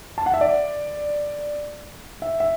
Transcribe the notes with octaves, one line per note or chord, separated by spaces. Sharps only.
A5
F#5
E5
D5
E5
E5